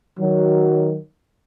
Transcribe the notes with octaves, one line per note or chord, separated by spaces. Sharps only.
D#3 F#3